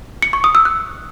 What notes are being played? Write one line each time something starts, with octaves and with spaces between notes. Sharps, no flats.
C#7
C#6
D#6
E6
F#6